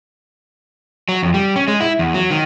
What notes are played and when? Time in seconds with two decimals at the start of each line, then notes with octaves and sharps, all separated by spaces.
1.09 F#3
1.23 F2
1.34 G3
1.56 C#4
1.68 G#3
1.80 E4
1.99 E2
2.14 F#3
2.31 D#3